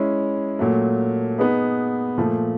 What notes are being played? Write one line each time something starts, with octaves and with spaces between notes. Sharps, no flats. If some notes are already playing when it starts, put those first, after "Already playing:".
Already playing: G#3 C#4 E4
A#2 F#3 A3
B3 D#4 G#4 B4
A#2 F3 A3